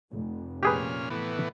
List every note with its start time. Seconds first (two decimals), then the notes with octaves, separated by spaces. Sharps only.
0.12 F1
0.63 A#2 C#4 G4 G#4 B4 F6
1.10 A2 E3 B3